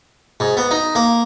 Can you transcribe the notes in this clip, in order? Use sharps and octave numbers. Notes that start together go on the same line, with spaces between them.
G#2
B3
D#4
A#3